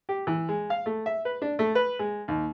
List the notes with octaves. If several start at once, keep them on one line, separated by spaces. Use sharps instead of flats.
G4
E3
G#3
F5
A3
E5
B4
D4
A3
B4
G#3
D#2